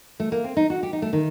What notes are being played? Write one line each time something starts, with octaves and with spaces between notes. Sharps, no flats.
A3
A#3
C4
D#4
F#4
G4
D#4
A3
D#3